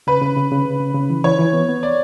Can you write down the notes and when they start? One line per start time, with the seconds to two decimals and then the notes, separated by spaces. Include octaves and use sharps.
0.07 C#3 B4
0.22 C#3
0.37 C#3
0.52 C#3
0.65 C#3
0.80 C#3
0.95 C#3
1.10 E3
1.24 E3 C#5
1.39 E3
1.53 B3
1.69 B3
1.83 D5